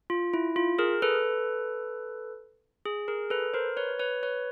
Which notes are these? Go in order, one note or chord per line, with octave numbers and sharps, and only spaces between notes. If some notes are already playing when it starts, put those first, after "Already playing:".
F4
E4
F4
G#4 A#4
A4 B4
G#4
G#4 A#4
A4 B4
A#4 C5
B4 C#5
B4 C#5
B4 C#5